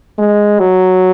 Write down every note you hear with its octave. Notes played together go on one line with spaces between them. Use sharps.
G#3
F#3